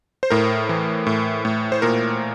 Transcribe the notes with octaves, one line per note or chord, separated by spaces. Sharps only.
C5
A2 A#4
E3
A2
A2
C5
A#2 A#4